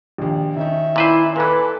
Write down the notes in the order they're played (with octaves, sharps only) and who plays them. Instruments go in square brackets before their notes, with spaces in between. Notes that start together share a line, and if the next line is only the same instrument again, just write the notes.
[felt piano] A#1 D#2
[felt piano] D#3 C#4 D#4 [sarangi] E5
[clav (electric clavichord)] A#2 B4 C5 [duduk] E4
[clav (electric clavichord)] A#2 E3 [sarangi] A4 [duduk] B4